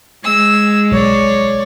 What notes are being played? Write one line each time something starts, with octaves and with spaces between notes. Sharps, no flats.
G#3 E6
B1 C#5 D5